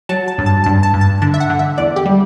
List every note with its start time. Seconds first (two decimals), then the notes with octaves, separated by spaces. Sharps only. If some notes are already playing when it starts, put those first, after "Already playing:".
0.09 F#3 A5
0.28 A5
0.38 G2
0.46 A5
0.64 G2 A5
0.83 A5
0.93 G2
1.01 A5
1.22 D3 A5
1.34 E5
1.40 F#5
1.50 D3
1.59 E5
1.78 E2 D5
1.96 G4
2.05 G3